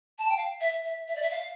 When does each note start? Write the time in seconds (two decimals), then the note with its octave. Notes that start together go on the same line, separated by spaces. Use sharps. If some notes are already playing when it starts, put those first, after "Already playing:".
0.18 A5
0.28 G5
0.37 F5
0.60 E5
0.84 E5
1.07 E5
1.15 D5
1.22 E5
1.31 F5